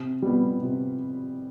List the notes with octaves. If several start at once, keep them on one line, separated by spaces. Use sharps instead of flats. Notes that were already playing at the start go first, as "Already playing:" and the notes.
Already playing: C3
G3 B3
C3